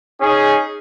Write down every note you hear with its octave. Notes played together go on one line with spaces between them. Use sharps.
C#4 D#4 G#4